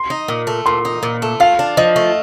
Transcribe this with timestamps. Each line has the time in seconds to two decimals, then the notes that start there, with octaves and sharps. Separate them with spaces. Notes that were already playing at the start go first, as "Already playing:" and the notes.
Already playing: C6
0.10 D#4
0.28 A#2
0.47 A3
0.66 A#2 C6
0.85 D#4
1.03 A#2
1.22 A3
1.40 F4 F5
1.59 D4
1.77 F3 D#5
1.96 A3